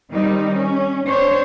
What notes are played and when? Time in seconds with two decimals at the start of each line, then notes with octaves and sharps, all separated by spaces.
0.11 D#3 G3 C4 D#4
0.54 C#4
1.07 C4 D4 C5 C#5